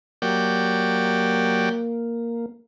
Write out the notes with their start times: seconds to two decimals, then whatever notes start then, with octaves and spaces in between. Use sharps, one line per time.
0.22 F#3 A#3 G4 D5